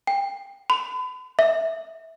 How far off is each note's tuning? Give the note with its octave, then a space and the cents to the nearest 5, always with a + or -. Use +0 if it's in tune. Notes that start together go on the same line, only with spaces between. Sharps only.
G5 +20
B5 +40
E5 -15